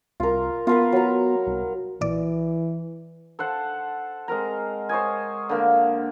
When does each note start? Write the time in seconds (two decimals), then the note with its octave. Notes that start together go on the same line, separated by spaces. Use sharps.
0.20 C2 F4 A#4
0.67 B3 F4 A#4 B4
0.92 F#3 A#5
1.47 C2
2.01 A#1 E3 D5
3.39 A4 C5 F#5 A5
4.28 G#3 C4 A#4 A#5
4.89 C5 C#5 D#5 G#5
5.49 D3 A#3 A#4